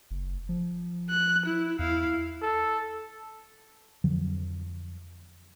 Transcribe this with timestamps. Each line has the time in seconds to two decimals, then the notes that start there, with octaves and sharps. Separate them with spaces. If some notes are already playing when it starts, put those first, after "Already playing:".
0.11 F#1
0.49 F3
1.10 F#6
1.45 E4
1.79 E2 E4 F5
2.42 A4
4.04 F2 D3 F3 F#3